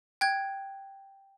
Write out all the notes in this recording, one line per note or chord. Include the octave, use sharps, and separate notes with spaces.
G5 F#6 G#6